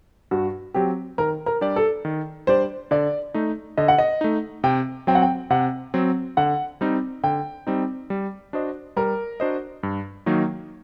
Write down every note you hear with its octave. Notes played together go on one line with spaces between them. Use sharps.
G2 F#4
F#3 C4 G4
D#3 A#4
A#4
G3 D4 G4 D5
A4
D#3
G3 D4 G4 C5 D5
D3 D5
A3 D#4
D3 D#5
F#5
D#5
A3 D#4
C3 G5
F#3 C4 G5
F#5
G5
C3 F#5
F#3 C4
D3 F#5
G3 C4 D#4
D3 G5
G3 C4 D#4
G3
D4 F#4 C5 D#5
G3 A#4
D4 F#4 C5 D#5
G2
D#3 F#3 A#3 D#4